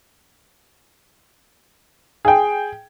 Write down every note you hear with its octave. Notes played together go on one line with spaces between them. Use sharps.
G#4 G5